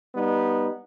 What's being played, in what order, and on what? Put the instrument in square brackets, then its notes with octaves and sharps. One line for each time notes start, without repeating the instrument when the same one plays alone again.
[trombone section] G3 B3 D#4